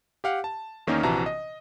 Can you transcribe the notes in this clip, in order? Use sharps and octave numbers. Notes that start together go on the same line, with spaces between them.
G4 F5 F#5
A5
E2 D#3 A#3 C#4 D#4 A#4
A#1 C3 E3 F#4 A5 A#5
D#5